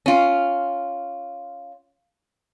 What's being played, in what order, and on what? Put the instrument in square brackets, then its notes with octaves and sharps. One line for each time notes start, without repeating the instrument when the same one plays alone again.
[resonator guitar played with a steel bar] C#4 F4